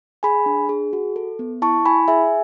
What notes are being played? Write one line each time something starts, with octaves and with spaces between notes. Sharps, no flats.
G#4 G#5 B5
D4
G#4
F#4
A4
B3
E4 A5 C#6
E4 G#5 B5
G#4 E5 G#5